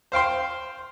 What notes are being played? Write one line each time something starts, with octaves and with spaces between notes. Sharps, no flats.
C5 F5 G5 C6